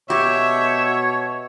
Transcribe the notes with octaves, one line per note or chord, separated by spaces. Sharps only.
B2 G4 C#5 E5